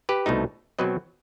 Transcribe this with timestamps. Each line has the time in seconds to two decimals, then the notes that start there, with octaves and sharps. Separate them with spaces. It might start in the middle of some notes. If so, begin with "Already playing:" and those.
0.09 G4 B4
0.26 C2 B2 A3 D#4
0.79 B2 F#3 C4 B4 D#5